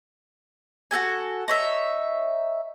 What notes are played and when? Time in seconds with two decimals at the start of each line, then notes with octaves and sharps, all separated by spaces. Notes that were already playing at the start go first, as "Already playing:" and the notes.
0.91 F#4 G4 A4 G#5
1.48 D#4 C#5 E5